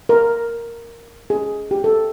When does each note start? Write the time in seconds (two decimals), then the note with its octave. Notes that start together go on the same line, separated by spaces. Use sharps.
0.09 A#4
1.30 G#4
1.71 G4
1.84 A4